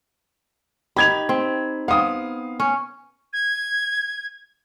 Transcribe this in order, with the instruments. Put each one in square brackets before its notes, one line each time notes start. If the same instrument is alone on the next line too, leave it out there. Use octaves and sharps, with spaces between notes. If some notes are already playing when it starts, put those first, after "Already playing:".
[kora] D#4 G4 [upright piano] B5 G#6 F7
[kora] C4
[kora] B3 C4 [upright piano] F5 D#6
[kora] C#4
[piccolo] G#6